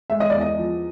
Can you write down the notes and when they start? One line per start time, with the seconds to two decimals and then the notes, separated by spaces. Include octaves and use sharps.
0.10 G#3 E5
0.20 D#5
0.30 E2 D5
0.41 D#5
0.58 F3